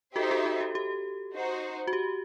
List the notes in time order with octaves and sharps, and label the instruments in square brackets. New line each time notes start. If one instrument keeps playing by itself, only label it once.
[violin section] D#4 G4 C5 E5 [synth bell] F#4 A4
[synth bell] F#4 A4
F#4
G4
G4
[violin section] D#4 F#4 C5
[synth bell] F#4
G4